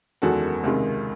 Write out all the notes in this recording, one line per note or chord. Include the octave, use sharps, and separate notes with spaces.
F#1 E2 D#3 G#3 F#4 A4
C#2 C3 D#3 G#3